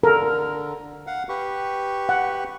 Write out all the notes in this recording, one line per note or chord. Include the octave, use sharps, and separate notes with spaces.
D3 A4 A#4
F5 F#5
G4 B4 C#6
F#5